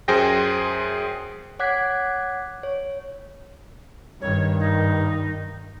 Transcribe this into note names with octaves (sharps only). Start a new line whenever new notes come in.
F#2 G#4 C5 G5 A#6
C#5 F#5 D6 F#6 G#6 B6
C#5
G2 D#3 C#5
D#4